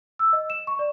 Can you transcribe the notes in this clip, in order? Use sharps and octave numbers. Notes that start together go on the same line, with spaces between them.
E6
D#5
E7
C#6
D5